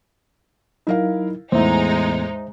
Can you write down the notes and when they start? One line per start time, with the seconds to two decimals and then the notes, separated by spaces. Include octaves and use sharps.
0.87 F#3 D#4 E4 A#4 F5
1.52 E2 A2 G#3 D#4 C5 E5